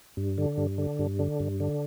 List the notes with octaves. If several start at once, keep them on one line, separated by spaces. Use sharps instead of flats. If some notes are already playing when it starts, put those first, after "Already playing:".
G2
D3
G2
D3
G2
D3
G2
D3